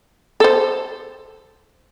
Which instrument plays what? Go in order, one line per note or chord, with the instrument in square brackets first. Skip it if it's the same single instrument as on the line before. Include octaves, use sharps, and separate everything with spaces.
[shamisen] A4 C5